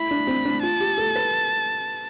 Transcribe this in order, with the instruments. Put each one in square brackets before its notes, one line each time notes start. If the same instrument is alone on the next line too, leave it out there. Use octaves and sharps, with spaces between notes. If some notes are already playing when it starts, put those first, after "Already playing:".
Already playing: [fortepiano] E4 [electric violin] B5
[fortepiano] D4
C4
D4
[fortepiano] F4 [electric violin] A5
[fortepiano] G4
A4
B4